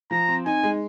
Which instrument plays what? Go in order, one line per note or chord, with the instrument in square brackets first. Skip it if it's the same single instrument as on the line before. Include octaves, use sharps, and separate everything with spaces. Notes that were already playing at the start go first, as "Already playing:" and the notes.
[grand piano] F3 [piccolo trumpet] A#5
[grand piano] C4
[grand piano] D#4 [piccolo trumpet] G#5
[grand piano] G#3